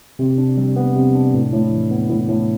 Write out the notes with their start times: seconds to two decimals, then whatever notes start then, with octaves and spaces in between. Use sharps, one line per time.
0.19 C3
0.38 D4
0.57 G3
0.76 B3
0.96 C3
1.15 D4
1.34 A2
1.53 A2
1.72 E3
1.91 B3
2.10 A2
2.29 A2